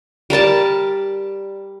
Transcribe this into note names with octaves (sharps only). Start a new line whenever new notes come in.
G3 A#4 D5 A5